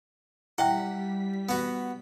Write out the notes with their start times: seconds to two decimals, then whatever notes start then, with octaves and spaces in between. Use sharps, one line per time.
0.58 G3 E4 E5 F#5 G5 B6
1.49 B3 F#4